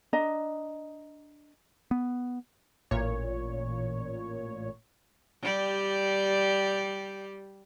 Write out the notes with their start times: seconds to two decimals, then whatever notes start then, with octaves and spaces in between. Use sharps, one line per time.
0.13 D4 D#5 A#5
1.91 B3
2.91 A1 A#2 C#5
5.42 G3 G4 D5